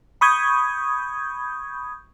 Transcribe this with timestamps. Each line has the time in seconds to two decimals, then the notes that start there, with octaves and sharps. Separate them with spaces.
0.21 B5 C#6 D#6 G6 G#6